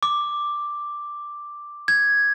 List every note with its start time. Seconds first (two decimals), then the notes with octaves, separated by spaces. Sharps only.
0.03 D6
1.88 G#6